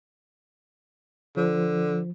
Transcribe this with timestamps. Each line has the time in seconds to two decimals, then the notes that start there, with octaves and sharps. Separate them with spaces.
1.37 D3 F3